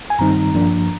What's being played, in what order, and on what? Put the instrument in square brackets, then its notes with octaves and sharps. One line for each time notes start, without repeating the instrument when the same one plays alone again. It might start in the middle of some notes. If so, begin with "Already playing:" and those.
[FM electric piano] G#5
G2 D#3 G3 C4 D#4 A#5
G2 F3 A#3 D4